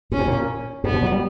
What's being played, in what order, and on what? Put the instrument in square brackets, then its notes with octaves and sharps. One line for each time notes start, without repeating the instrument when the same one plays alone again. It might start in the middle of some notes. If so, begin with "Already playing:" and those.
[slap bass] A#2 [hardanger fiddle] C#4
[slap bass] G2
A#2
[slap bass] G2 [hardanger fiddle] B3
[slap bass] B2
F#3
G3